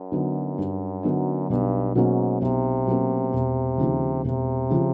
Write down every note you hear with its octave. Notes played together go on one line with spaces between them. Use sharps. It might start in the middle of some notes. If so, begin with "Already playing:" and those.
Already playing: F#2
D3 F#3 B3 D#4
G2
D3 F#3 B3 D#4
B1 G2
G#2 B2 F#3 A#3 C#4
B1 C3
B2 F#3 A#3 C#4
E1
D#2 C#3 F3
E1 C3
C#3 F3